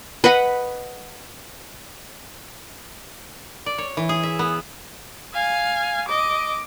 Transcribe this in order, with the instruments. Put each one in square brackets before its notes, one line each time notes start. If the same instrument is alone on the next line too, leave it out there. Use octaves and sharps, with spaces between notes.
[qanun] B4 D#5 F#5 B5
[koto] D5
C#5
E3
G#4
E5
B3
[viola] F5 G#5
D#5 D6